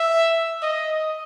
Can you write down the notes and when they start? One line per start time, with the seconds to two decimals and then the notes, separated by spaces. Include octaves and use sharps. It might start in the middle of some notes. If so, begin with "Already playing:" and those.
Already playing: E5
0.63 D#5